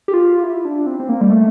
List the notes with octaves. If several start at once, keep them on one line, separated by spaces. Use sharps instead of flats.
G4
F4
E4
D4
C4
C4
A#3
G3
A3